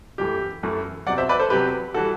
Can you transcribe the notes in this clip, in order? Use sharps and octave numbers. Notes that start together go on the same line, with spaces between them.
F#2 E3 A3 G4
F#2 E3 A3
E2 C3 F#3 D5 F#5
C5 E5
B4 D5
A4 C5
E2 C3 F#3 G4 B4
E3 G3 F#4 A4